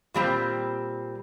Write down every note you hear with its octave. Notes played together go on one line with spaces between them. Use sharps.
A#2 G3 C4